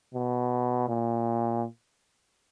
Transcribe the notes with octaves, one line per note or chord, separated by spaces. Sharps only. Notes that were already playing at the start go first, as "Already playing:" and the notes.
B2
A#2